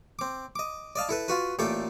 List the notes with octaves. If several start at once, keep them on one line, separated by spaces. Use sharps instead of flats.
C4 D6
D#5 D6
D5 D#5 F5 A5
E4 A4 B4
F4 F#4 B4
A1 A#2 A3 A4 G5 D6